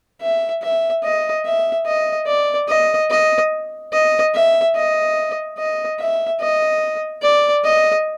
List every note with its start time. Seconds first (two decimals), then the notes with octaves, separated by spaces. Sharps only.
0.21 E5
0.62 E5
1.04 D#5
1.45 E5
1.86 D#5
2.27 D5
2.69 D#5
3.10 D#5
3.92 D#5
4.34 E5
4.75 D#5
5.58 D#5
5.99 E5
6.40 D#5
7.22 D5
7.65 D#5